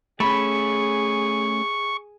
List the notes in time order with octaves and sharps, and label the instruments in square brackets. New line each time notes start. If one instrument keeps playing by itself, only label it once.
[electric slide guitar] A3 C#4 [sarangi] G#4 [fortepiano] B5 [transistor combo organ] C#6